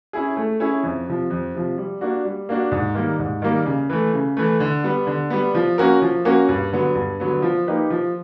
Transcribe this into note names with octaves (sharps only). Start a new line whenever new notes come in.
C#4 E4 G#4
A3
C#4 E4 G#4
F2
C3 F3
F2
C3 F3
G3
A#3 D4 F#4
G3
A#3 D4 F#4
G#2
D#3 G3 A#3
G#2
D#3 G3 A#3
C#3
E3 A3
C#3
E3 A3
D3
G3 B3
D3
G3 B3
F3
A#3 C#4 F#4 A#4
F3
A#3 C#4 F#4 A#4
G2
D3 F#3 B3
G2
D3 F#3 B3
F3
A#3 D#4 G4 B4
F3